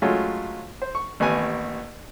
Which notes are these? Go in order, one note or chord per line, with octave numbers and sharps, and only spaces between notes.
F#3 G#3 A3 C#4 F4
C5
C#6
A1 D#2 B3 G#5